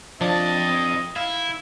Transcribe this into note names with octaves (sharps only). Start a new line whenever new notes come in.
F2 F3 D4 D#5 A5
E4 F5